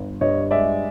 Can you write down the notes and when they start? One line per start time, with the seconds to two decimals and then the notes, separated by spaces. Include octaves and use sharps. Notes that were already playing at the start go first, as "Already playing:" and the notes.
Already playing: G1
0.21 G2 C#5 D#5
0.51 G#3 D5 E5